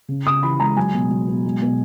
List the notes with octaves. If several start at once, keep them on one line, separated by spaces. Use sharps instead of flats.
C#3
C#3 D#6
E3 B5
G#3 A#5
F#3 G#5
B2
F#3
B2
G#3
B2